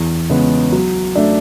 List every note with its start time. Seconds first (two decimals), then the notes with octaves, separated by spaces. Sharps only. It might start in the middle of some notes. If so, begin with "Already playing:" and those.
Already playing: E2
0.30 C#3 G#3 B3
0.72 F#3
1.15 A3 D4